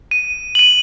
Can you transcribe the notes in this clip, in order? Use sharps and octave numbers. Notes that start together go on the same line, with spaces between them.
D#7
F#7
D#7